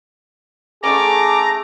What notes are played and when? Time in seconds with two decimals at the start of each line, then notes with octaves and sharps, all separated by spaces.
0.84 A3 B3 C#4 G#4 A#5 D6